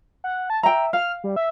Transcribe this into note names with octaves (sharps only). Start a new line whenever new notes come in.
F#5
A5
E5 G5 A#5
F5 F6
G3
E5